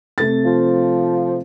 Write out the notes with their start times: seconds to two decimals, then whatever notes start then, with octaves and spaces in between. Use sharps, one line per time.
0.18 C3 A3 A6
0.45 F3